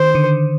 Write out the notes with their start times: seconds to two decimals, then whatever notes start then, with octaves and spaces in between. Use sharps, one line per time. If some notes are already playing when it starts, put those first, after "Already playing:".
Already playing: D#3 C5
0.15 D3